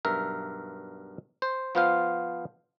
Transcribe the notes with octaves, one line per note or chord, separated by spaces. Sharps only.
B1 G2 A#4 E5
C5
F3 B3 F4 C5 F5